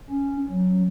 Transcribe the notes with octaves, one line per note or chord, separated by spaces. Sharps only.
C#4
F#3